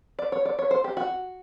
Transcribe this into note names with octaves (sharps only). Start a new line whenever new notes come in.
D5
C#5
D5
C#5
C5
G4
F#4